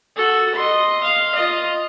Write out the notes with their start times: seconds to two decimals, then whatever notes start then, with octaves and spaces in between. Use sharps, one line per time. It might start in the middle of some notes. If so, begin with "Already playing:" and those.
0.16 F#4 A4
0.55 D#5 C6
1.03 F5
1.35 F4 D#5